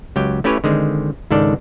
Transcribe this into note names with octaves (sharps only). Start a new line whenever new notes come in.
C#2 F#3 G4 G5
A3 C#4 E4 G4 B4 C#5
D3 D#3 G#3 C4
C#2 G#2 D#3 D4 A4 D5